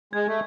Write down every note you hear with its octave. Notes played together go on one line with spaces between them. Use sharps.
G#3 G#6
A3